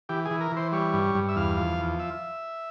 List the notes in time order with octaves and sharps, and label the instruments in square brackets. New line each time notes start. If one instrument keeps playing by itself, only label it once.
[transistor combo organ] E3 G4
G#4
E3
A#4
E3
C5
G3 C#5
G2
G2
E5
E2 F5
F3
E2
E5